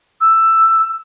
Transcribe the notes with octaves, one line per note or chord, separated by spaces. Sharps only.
E6